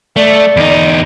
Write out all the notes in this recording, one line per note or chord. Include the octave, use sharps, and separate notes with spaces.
A3 D5
E2 D#4